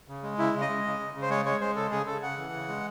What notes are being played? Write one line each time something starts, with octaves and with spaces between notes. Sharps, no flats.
C#3
G#3
C#3 E4
C#3
D#5
G#3
C#3
C#3
C#3
C5
G#3 C#5
G#3 C#5
G#3 C5
C#3 A4
C#3 G#4
C#3 A4
C#3 F#5
E3
C#3
G#3